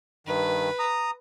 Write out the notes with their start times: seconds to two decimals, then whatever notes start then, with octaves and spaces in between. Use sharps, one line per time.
0.27 G2 D#3 B4
0.79 A#5 D#6